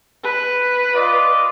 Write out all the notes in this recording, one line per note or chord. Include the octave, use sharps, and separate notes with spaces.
B4
F4 D5 D#5